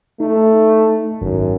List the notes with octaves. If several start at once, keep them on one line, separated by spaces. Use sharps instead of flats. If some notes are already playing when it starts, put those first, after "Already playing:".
A3 D#4
G#1 F#2